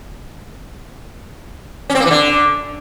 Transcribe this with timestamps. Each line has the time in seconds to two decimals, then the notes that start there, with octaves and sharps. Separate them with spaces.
1.90 C#4
1.95 C4
2.00 A#3
2.05 E3
2.11 D3